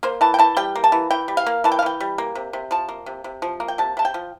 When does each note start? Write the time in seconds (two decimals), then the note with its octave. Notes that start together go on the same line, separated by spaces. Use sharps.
0.03 A#3 C5
0.21 E3 A5
0.34 G5
0.39 E3 A5
0.57 G3 G5
0.75 A#3
0.84 A5
0.92 E3
1.11 E3 G5
1.28 G3
1.37 F5
1.46 A#3
1.64 E3 A5
1.72 G5
1.79 F5
1.82 E3 G5
2.00 G3
2.18 A#3
2.35 C3
2.53 C3
2.71 F3 A5
2.89 A#3
3.06 C3
3.24 C3
3.42 F3
3.60 A#3
3.68 G5
3.78 C3 A5
3.97 C3 A5
4.05 G5
4.14 F3